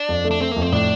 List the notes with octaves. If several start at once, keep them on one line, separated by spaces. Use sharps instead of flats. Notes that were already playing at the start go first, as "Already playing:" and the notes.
Already playing: D4
F2
A3
D4
A3 C4
F2 A#3
C4
A2 D4